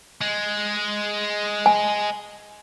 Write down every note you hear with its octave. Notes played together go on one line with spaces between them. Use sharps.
G#3
G#5